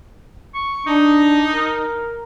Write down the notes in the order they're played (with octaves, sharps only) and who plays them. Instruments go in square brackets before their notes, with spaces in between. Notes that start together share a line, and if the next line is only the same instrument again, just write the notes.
[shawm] C#6
[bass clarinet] D4 [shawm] D#4
[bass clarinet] A#4